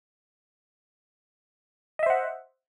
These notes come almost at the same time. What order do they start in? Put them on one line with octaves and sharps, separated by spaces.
D#5 E5 C5 F#5